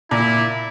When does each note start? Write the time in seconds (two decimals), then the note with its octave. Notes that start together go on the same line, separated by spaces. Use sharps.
0.11 A#2 E4